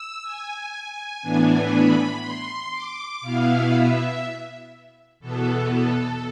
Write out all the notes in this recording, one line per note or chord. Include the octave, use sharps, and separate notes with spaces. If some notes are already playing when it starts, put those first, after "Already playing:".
Already playing: E6
G#5
A2 E3 B3 D4
B5
C6
D6
B2 B3 E4 F5
E5
E2 B2 B3 A4
A4